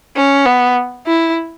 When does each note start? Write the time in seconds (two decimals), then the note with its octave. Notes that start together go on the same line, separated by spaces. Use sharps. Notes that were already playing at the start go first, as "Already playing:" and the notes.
0.17 C#4
0.46 B3
1.07 E4